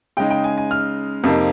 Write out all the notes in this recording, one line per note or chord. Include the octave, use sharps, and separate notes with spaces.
C#3 G#3 D#4 G5
G5
G#5
G#5
F6
F2 C3 F3 A#3 D#4